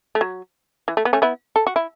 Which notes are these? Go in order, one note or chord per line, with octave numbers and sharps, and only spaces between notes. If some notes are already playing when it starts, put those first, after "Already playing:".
A3
F#3
E3
A3
B3
A3 C#4
B3 E4
A4
F#4
E4